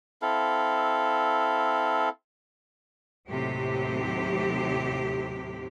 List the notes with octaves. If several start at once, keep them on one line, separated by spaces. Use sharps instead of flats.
C4 E4 A4 F5
D#2 A2 C3 F#3 G4